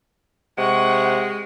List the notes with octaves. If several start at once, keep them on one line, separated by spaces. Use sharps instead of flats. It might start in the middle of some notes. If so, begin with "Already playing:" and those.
C3 G#3 F#5 C#6